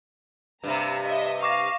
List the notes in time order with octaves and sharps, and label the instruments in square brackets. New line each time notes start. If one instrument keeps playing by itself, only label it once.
[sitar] G2 C3 [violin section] A#5 E6
[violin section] D#5 E5
[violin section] F5 [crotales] C#6 D6 A#6